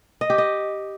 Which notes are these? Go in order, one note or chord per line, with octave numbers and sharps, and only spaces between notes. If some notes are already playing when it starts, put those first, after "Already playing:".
D#5
G4
D#5